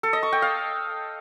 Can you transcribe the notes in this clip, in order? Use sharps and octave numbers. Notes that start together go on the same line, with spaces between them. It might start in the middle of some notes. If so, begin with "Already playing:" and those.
A4
D#5
C#6
G5
F5